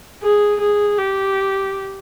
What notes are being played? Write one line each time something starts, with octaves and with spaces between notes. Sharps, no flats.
G#4
G#4
G4